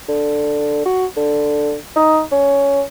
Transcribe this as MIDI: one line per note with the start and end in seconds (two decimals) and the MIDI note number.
0.08 0.82 50
0.86 1.06 66
1.17 1.75 50
1.96 2.21 63
2.32 2.83 61